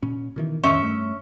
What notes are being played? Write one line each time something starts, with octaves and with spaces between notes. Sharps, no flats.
A#2 C#4
B2 D#3 E3
F2 A2 D#3 C#4 E5
G2 A3